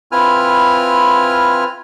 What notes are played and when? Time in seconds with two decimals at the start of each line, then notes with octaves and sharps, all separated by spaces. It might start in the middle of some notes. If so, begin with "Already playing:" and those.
0.12 C4 E4 F4 B4 G#5 F6